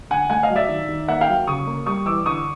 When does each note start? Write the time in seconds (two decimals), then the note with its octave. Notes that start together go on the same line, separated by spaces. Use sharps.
0.10 D3 F#5 G#5
0.30 A3 F#5 G#5
0.43 D#5 F5
0.50 F#3
0.56 D5 E5
0.69 D#3
0.89 D#3
1.08 A#3 E5 F#5
1.21 F5 G5
1.28 F#3
1.47 C#3 C#6 D#6
1.67 A#3
1.86 G3 C#6 D#6
2.06 E3 D6 E6
2.25 D3 C#6 D#6